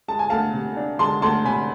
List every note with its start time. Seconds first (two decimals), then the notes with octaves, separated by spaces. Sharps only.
0.08 G#3 A5
0.19 G#5
0.30 D2 F5 A5
0.54 C3
0.77 D4
0.99 G#3 A5 C6
1.22 D2 A5 C6
1.45 C3 G#5 B5